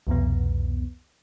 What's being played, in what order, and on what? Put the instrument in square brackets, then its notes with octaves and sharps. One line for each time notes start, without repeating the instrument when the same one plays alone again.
[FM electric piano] C2 F2 B2 B3